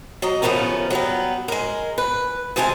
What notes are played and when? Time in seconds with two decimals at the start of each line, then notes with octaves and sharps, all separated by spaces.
0.22 F#3 D#5 A#5
0.42 D#2 C#3 F3 A3 B3 A#4
0.90 F#3 G3 B3
1.48 G#3 A#4
1.98 B4
2.56 D2 C3 G#3 C4 G#5 A5